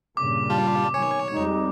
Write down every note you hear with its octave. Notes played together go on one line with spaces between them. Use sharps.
G2 A#2 C#3 D6
G3 F4 A5
B2 D#3 F#3 C#5 G#5
F2 G3 G#3 D#4